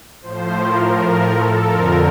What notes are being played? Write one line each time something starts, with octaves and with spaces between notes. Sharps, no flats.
A2 F3 C5
A#4
A#4
A4
F2 D3 F3 A#4